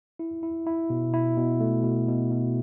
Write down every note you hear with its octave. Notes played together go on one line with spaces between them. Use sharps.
E4
E4
E4
B2
E4
B2
A3
B2
B2
B2